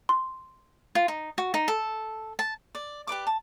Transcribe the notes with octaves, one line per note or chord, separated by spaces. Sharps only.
C6
F4
D#4
F#4
D#4
A4
A5
D5
G4 B4 D5 D6
A5